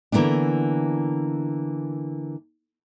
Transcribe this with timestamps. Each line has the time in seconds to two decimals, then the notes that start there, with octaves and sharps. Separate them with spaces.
0.12 D3 E3 F#3 A#3 B3 D4